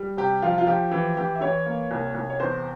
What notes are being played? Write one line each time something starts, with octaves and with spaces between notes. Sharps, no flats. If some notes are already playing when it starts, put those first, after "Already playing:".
Already playing: G3
C3 G4
F3 F4
F4
F3 G4
E3 G4
E3 G4
E5
E3 C#5
A#3
C2
C2
C#5
E2 C5